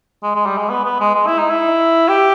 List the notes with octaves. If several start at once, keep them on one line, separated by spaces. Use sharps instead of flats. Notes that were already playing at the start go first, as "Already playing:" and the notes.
G#3
G#3
G3
G#3
B3
B3
G#3
G#3
E4
D#4
E4
G4